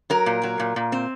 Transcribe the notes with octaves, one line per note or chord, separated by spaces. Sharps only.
F#3 A#4
A#2
F#3
A#2
A#2
C4